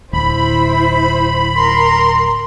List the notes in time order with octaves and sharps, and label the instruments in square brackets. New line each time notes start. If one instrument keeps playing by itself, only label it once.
[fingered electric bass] D1 [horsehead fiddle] E4 C5 [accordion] B5
[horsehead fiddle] A#4 A#5 [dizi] C6